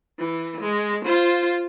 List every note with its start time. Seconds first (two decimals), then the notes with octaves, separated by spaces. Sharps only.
0.19 E3
0.60 G#3
1.05 F4 C5